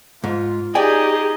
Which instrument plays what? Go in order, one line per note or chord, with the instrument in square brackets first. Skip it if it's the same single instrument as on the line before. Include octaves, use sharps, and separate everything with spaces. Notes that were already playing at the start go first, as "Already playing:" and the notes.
[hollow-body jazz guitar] G#2 [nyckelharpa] F4
[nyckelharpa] D#4 D#5 [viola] G4 G#4 [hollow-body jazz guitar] D5 G5 G#5